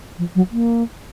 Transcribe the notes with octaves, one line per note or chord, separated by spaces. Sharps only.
F3
F#3
A#3